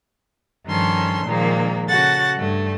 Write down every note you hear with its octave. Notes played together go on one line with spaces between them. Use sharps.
G2 D#3 F3 C#4 A4 C6
A#2 D#3 F3 G#3 A#3
C#3 F#4 A4 F#5 A6
G2 A3